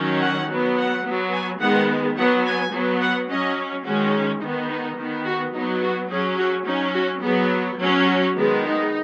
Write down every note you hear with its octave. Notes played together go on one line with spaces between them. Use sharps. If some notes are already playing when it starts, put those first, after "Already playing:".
Already playing: D#3 F#3 C#4
F#5
F#3 B3
F#5
B3
F#3
G#5
D#3 G#3 B3 F#5
F#3 B3 F#5
G#5
F#3 B3
F#5
F#3 C#4 D#5
D#3 G#3 C#4 F#4
D#3 B3 D#4
D#4
D#3 B3
F#4
F#3 B3 D#4
F#4
F#3 C#4 G#4
F#4
F#3 C#4 D#4
F#4
F#3 B3 G#4
F#3 C#4
F#4
D#3 G#3 B3
D#4